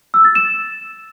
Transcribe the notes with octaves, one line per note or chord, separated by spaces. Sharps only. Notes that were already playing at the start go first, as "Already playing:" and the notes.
E6
A6
E7